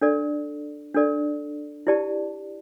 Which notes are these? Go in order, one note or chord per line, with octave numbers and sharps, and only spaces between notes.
D4 A4 D5
D4 A4 D5
E4 G4 D5 A5